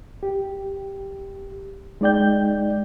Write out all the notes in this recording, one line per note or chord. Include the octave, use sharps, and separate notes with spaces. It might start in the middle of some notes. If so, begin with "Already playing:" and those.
G4
G#3 D#4 D5 G5 G6